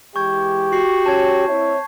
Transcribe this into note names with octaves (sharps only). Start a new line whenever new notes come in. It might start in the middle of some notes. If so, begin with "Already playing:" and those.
E3 G#3 G4 C#6 G6 G#6
F#4 C#6 C7
C#4 C#5 A5 G#6
C4 E4 C#5